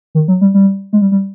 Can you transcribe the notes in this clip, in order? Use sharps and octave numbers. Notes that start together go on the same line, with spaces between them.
D#3
F#3
G3
G3
G#3
G3
G3